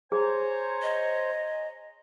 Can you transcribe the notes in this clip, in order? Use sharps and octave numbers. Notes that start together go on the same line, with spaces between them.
G#4 C5 C#5 G#5 A#5
D#5